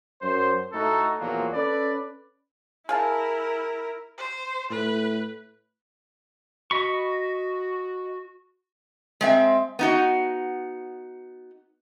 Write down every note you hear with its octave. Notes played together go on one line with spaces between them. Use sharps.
F#2 C5
A2 A3 D#4 F#4 A4
E2 A#2 F3 F#3 A#3
C#4 A4 B4 D5
E4 G#4 A#4 F5 A5
C5
A2 B4
F#4 D#5 B5 C#6
G#3 C4 E5
B3 D#4 F#4